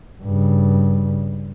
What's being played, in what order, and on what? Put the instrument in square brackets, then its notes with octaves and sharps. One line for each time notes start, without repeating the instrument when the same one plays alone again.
[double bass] G2 C#3